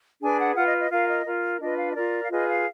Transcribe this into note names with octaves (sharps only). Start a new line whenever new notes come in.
D4 G#4 B4 G#5
F#5
F4 B4 F#5
D#5
D#5
F4 A#4 F5
D#5
F4 A#4
D4 F4 B4 D#5
F5
D#5
F4 A#4 D5
F5
F4 G#4 B4 D#5
F5